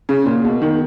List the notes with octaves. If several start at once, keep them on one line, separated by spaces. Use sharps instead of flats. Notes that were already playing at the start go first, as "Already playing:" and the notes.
C#3
A#2
B2
D#3